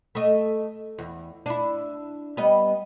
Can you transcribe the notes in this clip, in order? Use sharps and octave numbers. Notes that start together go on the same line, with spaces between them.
A3 D#5
E2
D4 E4
G3 B3 D#5